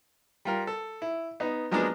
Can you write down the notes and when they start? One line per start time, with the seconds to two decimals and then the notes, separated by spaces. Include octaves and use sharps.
0.45 G3 F4 A#4
0.67 A4
1.02 E4
1.40 B3 D#4
1.71 F3 F#3 G#3 A#3 B3 D4